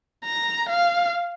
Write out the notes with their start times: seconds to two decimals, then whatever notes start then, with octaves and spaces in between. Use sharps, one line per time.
0.24 A#5
0.69 F5